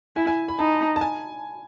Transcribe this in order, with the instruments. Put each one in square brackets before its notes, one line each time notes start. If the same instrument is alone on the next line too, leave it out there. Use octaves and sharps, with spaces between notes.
[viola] E4 [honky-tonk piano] G#5
[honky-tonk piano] G#5
B5
[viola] D#4 [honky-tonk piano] A5
[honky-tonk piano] A5
G#5